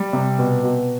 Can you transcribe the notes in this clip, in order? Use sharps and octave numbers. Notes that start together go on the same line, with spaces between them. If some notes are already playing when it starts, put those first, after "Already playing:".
Already playing: G3
C3
B2
B2